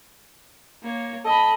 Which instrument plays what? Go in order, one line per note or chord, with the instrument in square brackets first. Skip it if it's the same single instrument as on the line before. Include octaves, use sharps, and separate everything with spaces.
[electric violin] A#3 C#5
[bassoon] A4 [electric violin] D#5 B5